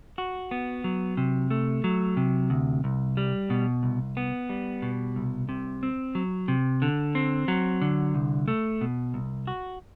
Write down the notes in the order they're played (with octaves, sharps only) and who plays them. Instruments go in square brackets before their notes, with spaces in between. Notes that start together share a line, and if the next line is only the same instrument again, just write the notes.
[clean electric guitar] F#4
B3
F#3
C3
A3
F#3
C3
D2
C2
G3
B2
C2
B3
G3
B2
C2
C3
C4
F#3
C3
D3
C4
F#3
D3
C2
A3
B2
C2
F#4